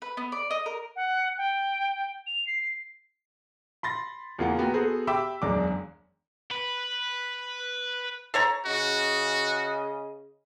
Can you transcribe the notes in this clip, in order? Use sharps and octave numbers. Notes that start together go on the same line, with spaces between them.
B4
B3
D5
D#5
A#4
F#5
G5
F7
C7
B5 C6 A6 A#6
E2 C#3 A#3 F4 F#5
A#3 B3 F#4 G5
B3 F#4 G#4 A4 C5
G4 E5 G5 B5 D6 E6
E1 C#2 F#2 D4 A#5 D6
B4
A4 C#5 A#5
C#3 F#4 D#5